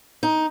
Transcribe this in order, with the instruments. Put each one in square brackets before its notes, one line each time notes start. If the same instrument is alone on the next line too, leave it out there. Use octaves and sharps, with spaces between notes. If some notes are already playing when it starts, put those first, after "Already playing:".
[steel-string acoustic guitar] D#4